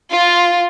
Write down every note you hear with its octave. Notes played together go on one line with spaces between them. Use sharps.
F4